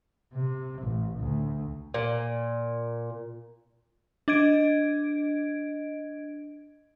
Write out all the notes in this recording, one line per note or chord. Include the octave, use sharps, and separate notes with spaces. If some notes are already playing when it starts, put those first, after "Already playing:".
C3
A1
D2
A#2
D4 D#5 G#6 D7